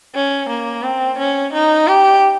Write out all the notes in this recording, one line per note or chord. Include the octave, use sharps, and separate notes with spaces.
C#4
A#3
C4
C#4
D#4
G4